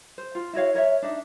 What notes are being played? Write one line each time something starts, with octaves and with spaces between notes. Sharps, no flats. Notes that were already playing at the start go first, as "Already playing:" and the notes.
C5
F4
E4 F#4 C#5 F5
A#4 C#5 D#5 E5
D4 D#4 E5